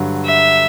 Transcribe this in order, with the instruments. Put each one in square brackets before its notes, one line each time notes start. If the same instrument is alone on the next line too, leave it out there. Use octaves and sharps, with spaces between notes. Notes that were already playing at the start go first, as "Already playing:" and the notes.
Already playing: [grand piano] G2 D3 F#3
[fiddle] E5